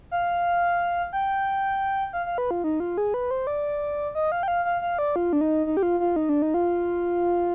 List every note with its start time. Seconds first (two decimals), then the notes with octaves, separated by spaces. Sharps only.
0.11 F5
1.13 G5
2.13 F5
2.26 F5
2.38 B4
2.51 F4
2.64 D#4
2.80 F4
2.98 G#4
3.14 B4
3.31 C5
3.47 D5
4.15 D#5
4.32 F5
4.43 G5
4.48 F5
4.65 F5
4.82 F5
4.98 D5
5.16 F4
5.33 D4
5.41 D#4
5.66 D#4
5.77 G4
5.83 F4
6.00 F4
6.16 D#4
6.29 D4
6.42 D#4
6.54 F4